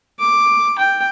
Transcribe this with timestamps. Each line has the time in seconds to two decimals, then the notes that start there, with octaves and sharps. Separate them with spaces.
0.19 D6
0.78 G5